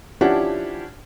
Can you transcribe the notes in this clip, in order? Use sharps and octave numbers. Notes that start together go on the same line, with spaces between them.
F3 C#4 D4 E4 G4 F#5